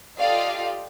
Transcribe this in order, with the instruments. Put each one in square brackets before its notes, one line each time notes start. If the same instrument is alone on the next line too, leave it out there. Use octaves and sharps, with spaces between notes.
[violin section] F4 G4 A4 D5 D#5 F5